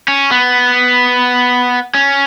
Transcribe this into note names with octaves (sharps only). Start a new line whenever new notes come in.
C#4
B3
C#4